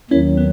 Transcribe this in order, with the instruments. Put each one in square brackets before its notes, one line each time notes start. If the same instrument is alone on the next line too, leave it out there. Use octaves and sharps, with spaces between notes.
[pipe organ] D#2 D#3 F#3 [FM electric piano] C#4 E4
[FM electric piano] B3